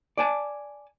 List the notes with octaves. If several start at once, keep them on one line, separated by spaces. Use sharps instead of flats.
D5 G#5 A5